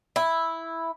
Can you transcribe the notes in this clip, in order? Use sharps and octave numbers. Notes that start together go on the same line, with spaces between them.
E4